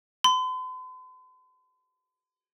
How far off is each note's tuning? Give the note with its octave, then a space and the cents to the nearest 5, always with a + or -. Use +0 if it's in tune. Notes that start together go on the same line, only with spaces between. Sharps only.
C6 -45